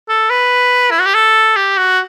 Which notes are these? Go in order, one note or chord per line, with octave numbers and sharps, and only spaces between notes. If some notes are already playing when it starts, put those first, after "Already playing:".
A4
B4
E4
F#4
G4
A4
G4
F#4